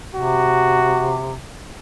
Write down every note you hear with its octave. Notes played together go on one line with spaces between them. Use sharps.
C3 F#4